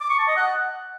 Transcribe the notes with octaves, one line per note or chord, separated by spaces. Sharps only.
D6
C#6
A5
D#5
F#5